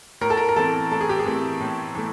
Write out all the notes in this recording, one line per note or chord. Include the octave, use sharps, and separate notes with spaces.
A2 A#4
A4
A#4
A#4
E3 A3 C4 A4
A2 A4
G#4
G4
G#4
E3 A3 C4
A2
E3 A3